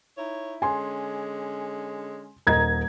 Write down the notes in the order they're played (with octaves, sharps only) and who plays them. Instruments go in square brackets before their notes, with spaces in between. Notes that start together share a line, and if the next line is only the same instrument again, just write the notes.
[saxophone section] D#4 E4 C#5
[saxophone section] D3 G#3 C#4 [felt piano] G#5 C6
[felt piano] D#1 A#4 D#5 [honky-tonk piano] A#5 G#6